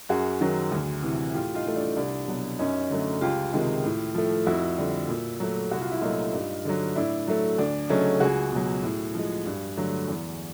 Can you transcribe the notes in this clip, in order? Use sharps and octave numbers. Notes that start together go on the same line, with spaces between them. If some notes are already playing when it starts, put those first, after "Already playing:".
F#2 F#4 G#4
D#3 F#3
D2
C3 E3
A2 F4 G4
D#4 F4
E3 A3
D4
C2 D4
B2 F#3
F#2 C#4 D#4
D3 F#3 A3
C#2 F4 G4
C3 D#3 G#3
A2
F3 A3
F2 E4 F#4
D3 G3
A#2
F#3 A3
C2 F#4
F4
E4
A#2 F#3 A3 D#4 F4
G2
D3 F#3
A2 D4 E4
F#3 A3
D2 D4
C#3 F#3 A3 C#4 D#4
C#2 F#4 G#4
B2 F#3
A2
F3 G#3
G2
D3 F#3 A3
E2